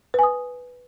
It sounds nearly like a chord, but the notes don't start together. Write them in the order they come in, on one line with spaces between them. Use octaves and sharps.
B4 G#5 D#6